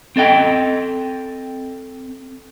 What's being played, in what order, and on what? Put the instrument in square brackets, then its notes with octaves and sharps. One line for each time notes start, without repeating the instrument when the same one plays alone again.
[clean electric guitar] C4 A4 D#5 G5